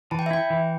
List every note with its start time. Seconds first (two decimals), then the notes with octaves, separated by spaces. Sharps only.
0.11 E3 A5
0.19 G5
0.26 E5
0.31 E4 G5
0.50 E3